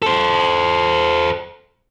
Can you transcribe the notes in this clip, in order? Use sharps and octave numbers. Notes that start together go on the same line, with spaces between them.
A4 C5